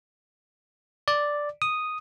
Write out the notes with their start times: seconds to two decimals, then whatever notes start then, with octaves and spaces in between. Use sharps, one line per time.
1.08 D5
1.62 D#6